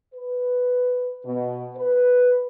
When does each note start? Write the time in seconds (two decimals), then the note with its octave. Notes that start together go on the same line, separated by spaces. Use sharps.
0.14 B4
1.25 B2
1.77 B4